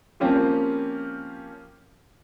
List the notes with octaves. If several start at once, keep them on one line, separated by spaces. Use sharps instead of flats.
F3 A#3 C4 C#4 F4 G4